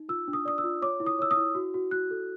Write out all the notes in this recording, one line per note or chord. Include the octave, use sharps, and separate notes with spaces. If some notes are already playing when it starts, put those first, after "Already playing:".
Already playing: D#4
F4 E6
D4
D#6
D5 D#6
E6
F4
C#5 D6
E4
D#6
C#5 E6
D#6
E4
F#4
F#4
F#4 F#6
A4